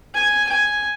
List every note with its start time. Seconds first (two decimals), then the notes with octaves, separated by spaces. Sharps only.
0.14 G#5
0.49 G#5